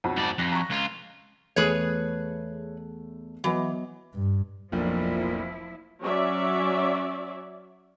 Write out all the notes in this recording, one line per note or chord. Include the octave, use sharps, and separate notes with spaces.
B1 F2 F#4
G#2 D5
F2 F#6 A#6 B6
A#5 C#6
C#2 F4
E2 A3 G#4 B4 C#5
E3 F#3 B3 D#5
G2
F1 B1 A#2 F3 D4 E4
F#3 C#4 C#5 D5 E5